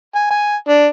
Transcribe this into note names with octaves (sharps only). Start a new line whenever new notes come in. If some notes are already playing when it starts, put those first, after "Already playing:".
G#5
G#5
D4